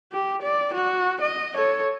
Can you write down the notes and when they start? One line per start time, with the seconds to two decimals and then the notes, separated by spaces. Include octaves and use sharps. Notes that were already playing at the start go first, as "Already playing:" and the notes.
0.12 G4
0.42 D5
0.74 F#4
1.21 D#5
1.55 A4 C#5